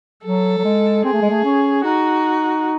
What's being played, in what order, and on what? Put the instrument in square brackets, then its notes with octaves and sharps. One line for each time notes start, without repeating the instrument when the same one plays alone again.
[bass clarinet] F#3 [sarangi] A4
[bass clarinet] F#3
G#3
[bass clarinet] C4 [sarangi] G#4
[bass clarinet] A3
G#3
A3
C#4
[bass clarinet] D#4 [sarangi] F#4